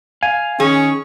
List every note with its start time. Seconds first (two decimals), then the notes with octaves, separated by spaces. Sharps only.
0.23 F5 G#5
0.60 D#3 C#4 G#4